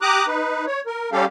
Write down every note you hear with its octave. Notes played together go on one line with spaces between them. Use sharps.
G4 A#5 D6 D#6 F#6
D#4 B4
C#5
A#4
G3 C#4 G4 A4 F5